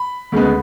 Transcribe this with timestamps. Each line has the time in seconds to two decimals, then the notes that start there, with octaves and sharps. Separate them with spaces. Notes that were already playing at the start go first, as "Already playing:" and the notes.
Already playing: B5
0.32 D2 C#3 G#3 B3